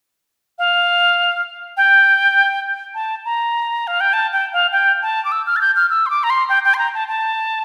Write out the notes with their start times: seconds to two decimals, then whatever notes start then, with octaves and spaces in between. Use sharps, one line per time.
0.58 F5
1.77 G5
2.95 A5
3.25 A#5
3.87 F5
4.00 G5
4.13 A5
4.32 G5
4.53 F5
4.72 G5
5.02 A5
5.25 D6
5.32 E6
5.46 F6
5.56 A6
5.61 G6
5.76 F6
5.90 E6
6.06 C6
6.10 D6
6.24 A#5
6.30 C6
6.49 G5
6.64 G5
6.74 C6
6.79 A#5
6.94 A5
7.08 A5